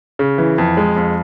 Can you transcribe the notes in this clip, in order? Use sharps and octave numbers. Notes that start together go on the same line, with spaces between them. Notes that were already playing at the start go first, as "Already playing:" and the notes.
C#3
E3
F2
G#3
F2